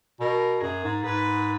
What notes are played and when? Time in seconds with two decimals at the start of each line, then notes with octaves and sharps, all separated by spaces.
0.20 B2 A#4
0.62 F#2 G#4
0.84 G#2
1.04 G#2 B4